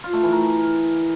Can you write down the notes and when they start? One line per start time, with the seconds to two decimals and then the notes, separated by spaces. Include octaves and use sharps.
0.04 F4
0.13 A3
0.23 E3
0.33 A#4